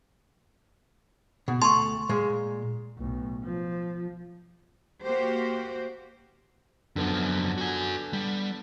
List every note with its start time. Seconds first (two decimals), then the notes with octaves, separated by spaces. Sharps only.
1.48 B2
1.62 D2 A3 A5 C6 C#6
2.09 A#2 G#3
2.98 B1 A2
3.44 F3
5.03 A#3 F#4 G4 C5
6.96 F#2 D3 F3 B3 D4
7.58 F#4 G#5
8.13 G3